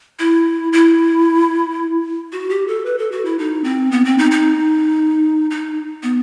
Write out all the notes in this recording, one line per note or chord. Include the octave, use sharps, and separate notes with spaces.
E4
E4
F#4
G4
A4
B4
A4
F#4
E4
D#4
C4
B3
C4
D#4
D#4
D#4
B3